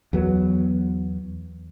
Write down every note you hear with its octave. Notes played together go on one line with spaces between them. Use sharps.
E2 F#3 B3